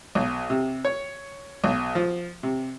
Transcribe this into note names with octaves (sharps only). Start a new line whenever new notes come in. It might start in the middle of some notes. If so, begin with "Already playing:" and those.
B1
C3
C#5
B1
F3
C3